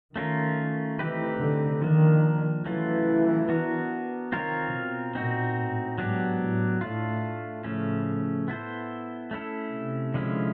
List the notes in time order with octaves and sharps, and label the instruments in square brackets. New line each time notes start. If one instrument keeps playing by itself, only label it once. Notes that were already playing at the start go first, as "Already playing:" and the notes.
[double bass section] D#3 [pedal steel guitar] A3 C#4 F4 A#4
[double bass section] E3 [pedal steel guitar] A3 C4 D#4 G4 B4
[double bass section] D3
[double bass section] D#3 [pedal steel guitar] F3 A#3 D4
[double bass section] E3 [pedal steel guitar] F#3 A3 C#4 F4
[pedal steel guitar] B3 D4 F#4 A#4
[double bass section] D#3 [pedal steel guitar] C4 F4 A#4 C#5
[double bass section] B2
[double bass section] A#2 [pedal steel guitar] C4 D#4 F#4
[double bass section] A2
[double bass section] G#2 [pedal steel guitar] F#3 B3 D4 G4
[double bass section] A2
[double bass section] A2 [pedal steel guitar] A3 D4 F4
[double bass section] A2
[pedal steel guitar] C#3 F3 A3 C#4
B3 E4 A4 C5
A3 C#4 E4 A4
[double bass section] C3
[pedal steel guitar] D3 F3 G#3 C#4 E4